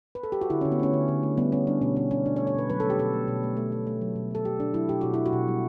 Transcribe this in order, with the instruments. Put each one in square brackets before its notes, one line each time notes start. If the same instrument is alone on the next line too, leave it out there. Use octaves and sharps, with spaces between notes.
[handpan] B4
A4
G4
F#4
D3 E4
D3 C#4
B3
A3 C#4
D3
D3
A3
G3 B3
G3 C#4
G3 D4
B2 C#4
B2 C#4
B2 C#4
B2 D4
C#5
A3
C#5
B2 B4
F#3 B4
A3 A4
G4
B2 A4
A3
B2
A3
A3
A3
A3
F#3
B2
F#3 A4
A3 G4
B2 D4
F#3 E4
B2 G4
B2 F#4
B2 E4
F#4
B2
G3